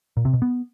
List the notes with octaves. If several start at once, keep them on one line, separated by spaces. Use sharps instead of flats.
A#2
C3
B2
B3